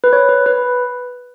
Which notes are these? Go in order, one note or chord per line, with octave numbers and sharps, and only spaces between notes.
B4
C#5
B4
B4